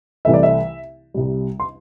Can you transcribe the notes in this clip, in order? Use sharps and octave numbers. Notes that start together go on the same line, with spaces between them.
C2 C3 E3 A3 E5
D5
E5
C2 C3 G3
C6